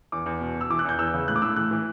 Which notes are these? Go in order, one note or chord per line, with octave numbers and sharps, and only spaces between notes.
E2 D6
E2
B2
B2
E6
E3 D6
F#6
E2 G6
E2 E6
C#3
A2 F#6
D6
A2 E6
E3 F#6
E3